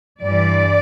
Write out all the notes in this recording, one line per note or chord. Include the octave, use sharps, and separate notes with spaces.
G2 E3 D5